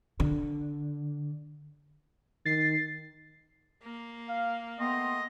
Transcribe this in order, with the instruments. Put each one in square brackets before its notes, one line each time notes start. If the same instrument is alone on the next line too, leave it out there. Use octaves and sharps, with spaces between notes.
[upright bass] D3
[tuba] D#3 [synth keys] A6 C7
[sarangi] A#3
[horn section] F5
[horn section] A3 G5 C6 [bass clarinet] B3 [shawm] D#5